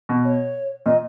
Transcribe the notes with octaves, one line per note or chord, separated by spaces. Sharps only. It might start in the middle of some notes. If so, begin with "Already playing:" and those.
B2
C#5
A#2 D#5